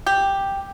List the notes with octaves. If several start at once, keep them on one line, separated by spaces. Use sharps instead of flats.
G4